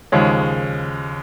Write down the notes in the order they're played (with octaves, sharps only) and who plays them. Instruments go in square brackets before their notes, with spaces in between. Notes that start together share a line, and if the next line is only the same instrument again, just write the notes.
[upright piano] D#2 C#3 F3 G#3 C#4